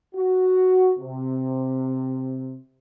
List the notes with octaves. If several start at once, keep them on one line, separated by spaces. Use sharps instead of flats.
F#4
C3